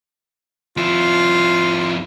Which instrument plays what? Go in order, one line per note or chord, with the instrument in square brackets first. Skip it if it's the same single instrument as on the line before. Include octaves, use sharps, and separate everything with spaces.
[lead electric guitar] F2 E4 [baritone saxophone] F4